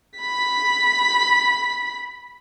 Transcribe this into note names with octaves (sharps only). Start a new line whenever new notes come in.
B5 B6